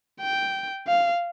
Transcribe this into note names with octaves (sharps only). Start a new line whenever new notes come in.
G5
F5